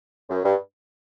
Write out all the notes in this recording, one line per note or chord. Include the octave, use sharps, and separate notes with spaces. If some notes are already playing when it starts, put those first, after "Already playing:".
F#2
G2